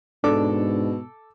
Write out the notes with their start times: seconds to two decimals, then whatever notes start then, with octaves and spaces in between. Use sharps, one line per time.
0.24 G#2 B2 D4 A4 D6